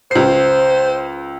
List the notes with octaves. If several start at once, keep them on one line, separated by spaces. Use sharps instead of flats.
C#2 C5 C7